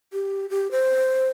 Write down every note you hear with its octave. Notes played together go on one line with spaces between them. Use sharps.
G4
G4
C5